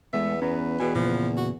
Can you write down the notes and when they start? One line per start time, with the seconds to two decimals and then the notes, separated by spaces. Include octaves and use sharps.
0.13 E2 G#3 A3 B3 E5
0.42 E2 C#4 B4 A#5
0.80 E2 B2 G#4 G5 G#5
0.95 A#2 C#3 F3 A#3
1.37 F#4